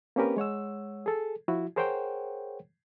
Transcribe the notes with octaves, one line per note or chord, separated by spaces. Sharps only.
A#3 C4 C#4 G4 A#4 B4
G#3 C#5 F#5 E6
G#4 A4
F3 E4 F#4
G#4 A#4 C5 C#5 F#5 G5